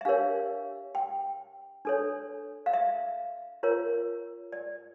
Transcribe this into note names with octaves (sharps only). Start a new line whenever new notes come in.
E5
D4 G4 A#4 C#5 F5
G5
D4 A4 C#5
F5
E5
F4 A#4 C#5
D5